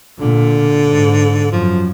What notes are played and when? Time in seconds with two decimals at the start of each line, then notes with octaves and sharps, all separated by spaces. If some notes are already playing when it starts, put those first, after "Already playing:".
0.19 A#2 D3
0.86 G#2
1.51 F#2 F3